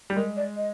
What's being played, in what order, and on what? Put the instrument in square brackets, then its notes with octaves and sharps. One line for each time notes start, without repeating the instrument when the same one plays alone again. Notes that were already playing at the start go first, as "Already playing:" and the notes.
[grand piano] G3
[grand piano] G#3 [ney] A#4
[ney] D5
D#5